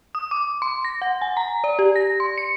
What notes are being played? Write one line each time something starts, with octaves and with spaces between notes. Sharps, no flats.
D#6
D6
C6
A#6
F#5
G#5
A#5
D5
G4
A#6
C6
C#7